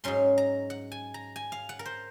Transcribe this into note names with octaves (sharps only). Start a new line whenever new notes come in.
G#2 F#3 C#4 C6
A#5
F#5
G#5
A#5
G#5
F5
F#5
A#4
C5